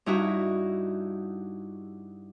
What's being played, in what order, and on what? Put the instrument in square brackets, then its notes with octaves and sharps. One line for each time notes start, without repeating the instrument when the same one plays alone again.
[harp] G2 D#4 E4 F#4